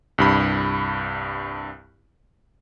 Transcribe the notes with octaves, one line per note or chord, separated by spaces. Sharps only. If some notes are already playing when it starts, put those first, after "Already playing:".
C2 G2 B5